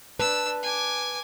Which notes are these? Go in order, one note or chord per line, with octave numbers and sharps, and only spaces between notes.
D4 B4 A5 E6
G#5 D6